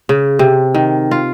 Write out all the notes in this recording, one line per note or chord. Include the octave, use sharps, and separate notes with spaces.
C#3
C3
D#3
F4